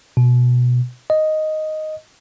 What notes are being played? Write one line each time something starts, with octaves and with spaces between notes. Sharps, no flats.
B2
D#5